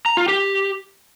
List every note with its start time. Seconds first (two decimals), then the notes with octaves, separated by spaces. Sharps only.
0.06 A#5
0.17 F4
0.28 G4